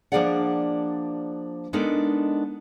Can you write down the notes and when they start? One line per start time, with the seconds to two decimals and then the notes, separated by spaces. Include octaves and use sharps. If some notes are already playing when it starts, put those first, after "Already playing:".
0.12 F3 A#3 D4 G#4 D5 F#5
1.73 G#3 B3 D4 D#4 A4 A#4